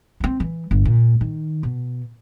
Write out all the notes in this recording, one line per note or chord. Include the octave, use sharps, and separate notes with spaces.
B3 C4
E3
G1
A#2
D#3
B2